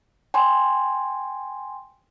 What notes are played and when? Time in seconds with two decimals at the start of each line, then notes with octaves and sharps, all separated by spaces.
0.34 G5 G#5 C6